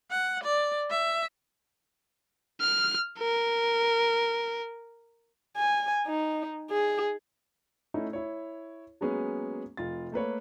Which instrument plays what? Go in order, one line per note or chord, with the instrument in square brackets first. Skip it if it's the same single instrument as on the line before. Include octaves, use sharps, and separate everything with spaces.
[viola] F#5
D5
E5
[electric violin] F6
A#4
[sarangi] G#5
D#4
G#4
[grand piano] A3 C#4 D#4 E4
E4 C#5
F#3 G#3 A#3 B3 C#4 G#4
F1 F4 A6
A3 A#3 B4 C#5